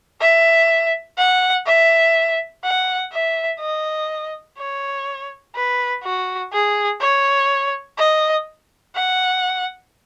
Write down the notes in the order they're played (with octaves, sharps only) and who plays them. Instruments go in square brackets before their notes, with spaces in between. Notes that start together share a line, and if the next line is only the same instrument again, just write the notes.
[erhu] E5
F#5
E5
F#5
E5
D#5
C#5
B4
F#4
G#4
C#5
D#5
F#5